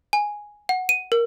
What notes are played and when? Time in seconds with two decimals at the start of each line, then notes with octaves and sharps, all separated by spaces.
0.13 G#5
0.69 F#5
0.89 D#7
1.12 A#4